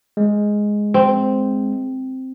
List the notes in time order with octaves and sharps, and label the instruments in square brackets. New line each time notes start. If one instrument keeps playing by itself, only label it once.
[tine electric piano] G#3
[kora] C4